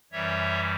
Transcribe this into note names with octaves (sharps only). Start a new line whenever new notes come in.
F#2 E3 G3 C#5 E5